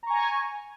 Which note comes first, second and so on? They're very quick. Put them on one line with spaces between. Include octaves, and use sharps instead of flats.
A#5 C#6 G#5